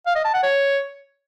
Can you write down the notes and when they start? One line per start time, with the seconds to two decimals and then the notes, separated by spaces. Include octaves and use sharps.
0.06 F5
0.15 D#5
0.25 A5
0.34 F#5
0.43 C#5